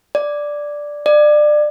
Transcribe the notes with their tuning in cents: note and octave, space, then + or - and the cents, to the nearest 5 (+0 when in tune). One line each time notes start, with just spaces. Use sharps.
D5 +0
D5 +25